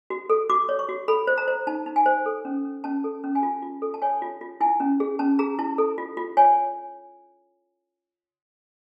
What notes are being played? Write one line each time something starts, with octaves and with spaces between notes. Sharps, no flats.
F#4
A4
F#4 D6
C#5
C#6
F#4
A4 B5
C5
A#5
C5
D#4 A5
D#4
G#5
C5
A4
C#4
C#4
C#4 A5
A4
C#4
G#5
F4 A5
F4
A4
A5
C#5 G#5
F4
F4
E4 G#5
C#4
G#4
C#4 A5
G#4 A#5
E4 A5
A4
F4
F4
C#5 G#5